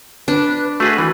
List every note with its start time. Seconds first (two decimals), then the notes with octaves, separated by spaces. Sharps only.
0.28 D4 B4
0.80 A3 F#4 G#4 B4
0.98 E3